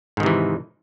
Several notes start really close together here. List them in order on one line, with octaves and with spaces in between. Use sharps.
G#2 D#3 C3 E3